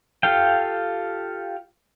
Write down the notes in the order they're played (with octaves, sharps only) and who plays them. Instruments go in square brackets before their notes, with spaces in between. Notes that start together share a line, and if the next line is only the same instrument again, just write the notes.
[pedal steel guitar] F4 G4 A4 F5 G5